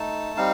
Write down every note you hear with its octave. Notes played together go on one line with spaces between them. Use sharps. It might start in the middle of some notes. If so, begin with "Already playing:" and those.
Already playing: A3 D#4 A5
G3 C4 D#4 F5